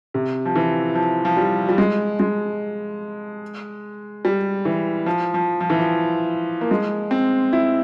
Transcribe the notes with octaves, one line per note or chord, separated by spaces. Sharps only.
C3
F3
E3
F3
F3
G3
G3
G#3
G#3
G3
E3
F3
F3
F3
E3
F3
A#3
G#3
C4
E4